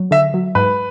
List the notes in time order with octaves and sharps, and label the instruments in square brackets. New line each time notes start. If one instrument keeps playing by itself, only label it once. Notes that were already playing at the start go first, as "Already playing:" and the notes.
Already playing: [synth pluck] F#3
[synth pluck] D3 [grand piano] E5
[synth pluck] F#3
[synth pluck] G#2 [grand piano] B4